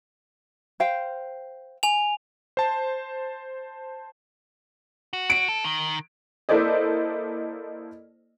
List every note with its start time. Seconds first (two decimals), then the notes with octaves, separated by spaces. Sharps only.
0.80 C5 F5 G5
1.83 G#5 F7
2.57 C5 A5
5.13 F#4
5.30 D7
5.48 A4
5.64 D#3
6.49 A#3 E4 A4 C5 D5 D#5